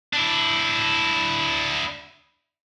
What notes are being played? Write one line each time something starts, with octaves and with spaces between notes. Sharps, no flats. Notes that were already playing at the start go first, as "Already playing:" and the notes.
D4 E4